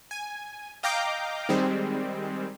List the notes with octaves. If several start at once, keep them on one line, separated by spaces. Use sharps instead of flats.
G#5
D#5 F5 G5 A#5 D6 G6
D#3 G3 G#3 C4